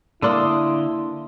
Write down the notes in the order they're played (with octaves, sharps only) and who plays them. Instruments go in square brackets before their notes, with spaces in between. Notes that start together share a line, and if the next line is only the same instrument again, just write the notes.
[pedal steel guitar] D3 C6 D#6 [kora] A#3 D4 A4 [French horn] E4